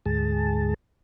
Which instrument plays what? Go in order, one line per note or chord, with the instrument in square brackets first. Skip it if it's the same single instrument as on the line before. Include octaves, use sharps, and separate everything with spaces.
[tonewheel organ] D2 G#2 G#4 A5